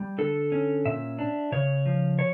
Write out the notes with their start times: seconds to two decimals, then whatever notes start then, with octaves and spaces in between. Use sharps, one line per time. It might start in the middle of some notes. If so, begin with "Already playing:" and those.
Already playing: G3
0.18 D3 A4
0.52 C#4
0.85 A#2 E5
1.19 D4
1.52 C#3 C#5
1.86 F3
2.19 C#5